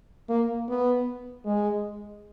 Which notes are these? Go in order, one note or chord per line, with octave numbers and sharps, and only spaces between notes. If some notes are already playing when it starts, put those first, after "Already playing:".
A#3
B3
G#3